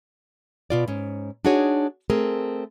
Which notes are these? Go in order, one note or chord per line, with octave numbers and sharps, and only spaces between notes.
B2 F4 D5
G#2 C#4
D4 D#4 F#4 G#4 C#5
A3 C4 G#4 A#4